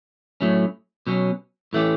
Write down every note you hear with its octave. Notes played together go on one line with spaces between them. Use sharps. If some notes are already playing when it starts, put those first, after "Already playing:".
A2 F#3 A3 C#4
B2 F#3 C#4
A2 E3 A3 C#4 G4